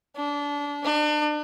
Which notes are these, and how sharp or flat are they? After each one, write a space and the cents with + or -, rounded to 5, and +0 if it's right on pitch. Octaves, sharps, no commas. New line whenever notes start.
D4 -25
D4 +35